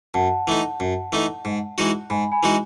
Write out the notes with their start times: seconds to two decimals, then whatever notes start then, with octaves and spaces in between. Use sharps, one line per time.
0.14 F#2 F#5 A5
0.47 E3 A3 D#4
0.80 F#2
1.12 E3 A3 D#4
1.45 G#2
1.78 E3 G#3 D#4 F#4
2.10 G#2 G#5 B5
2.32 G#5 B5
2.43 E3 G#3 D#4 F#4 G#5